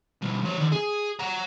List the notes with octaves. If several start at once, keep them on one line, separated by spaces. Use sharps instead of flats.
B2 G3
F3 C#5
D#3 D5
G#4
F#5 A#5